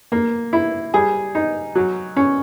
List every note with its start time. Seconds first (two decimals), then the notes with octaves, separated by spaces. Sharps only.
0.12 A#3
0.53 E4
0.94 G3 G#4
1.35 D#4
1.75 F#3
2.16 C#4